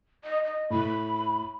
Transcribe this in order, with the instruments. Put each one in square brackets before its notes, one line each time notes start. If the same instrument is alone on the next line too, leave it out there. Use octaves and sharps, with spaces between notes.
[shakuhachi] D#5
D#5
[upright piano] A2 [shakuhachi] B5